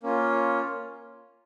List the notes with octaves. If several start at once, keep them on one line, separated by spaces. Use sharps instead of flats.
A#3 C#4 F4